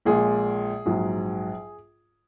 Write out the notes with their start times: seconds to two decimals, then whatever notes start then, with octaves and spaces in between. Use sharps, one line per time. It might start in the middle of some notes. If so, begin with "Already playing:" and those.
0.05 A#1 A#2 G#3 G#4
0.86 A#1 G#2 F#3